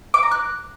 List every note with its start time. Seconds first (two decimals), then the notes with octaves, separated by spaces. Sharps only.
0.14 D6
0.23 A#5
0.31 F#6